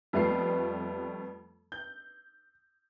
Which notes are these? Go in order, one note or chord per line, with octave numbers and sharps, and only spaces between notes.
F2 G3 A3 B3 F4 C7
G6